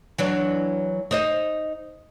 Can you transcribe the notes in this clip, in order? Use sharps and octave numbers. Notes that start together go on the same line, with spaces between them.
E3 F#3 D4
D#4 C5 D#5